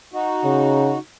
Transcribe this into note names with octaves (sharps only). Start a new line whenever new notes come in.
D#4 F#4
C#3